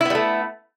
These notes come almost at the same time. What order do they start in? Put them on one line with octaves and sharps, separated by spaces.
E4 B3 G3 A3